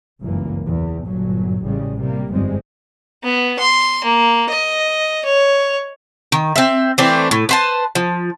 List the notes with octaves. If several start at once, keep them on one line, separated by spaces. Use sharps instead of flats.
G1 C#2 F#2 E3 A#3
E2
G1 A#2 F#3
A1 C#3 G3 G#3
C3 G3 A#3
G1 F2 G#2 G3 G#3 C4
B3
C6
A#3
D#5
C#5
D#3
C4 E5
E3 A3 C4 D4
A2
B4 C5 A5
F3